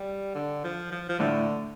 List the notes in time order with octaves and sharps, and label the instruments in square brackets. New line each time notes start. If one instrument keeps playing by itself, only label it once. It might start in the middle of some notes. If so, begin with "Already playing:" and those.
Already playing: [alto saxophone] G3
D3
F3
F3
F3
[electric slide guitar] A2 A3 [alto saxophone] D3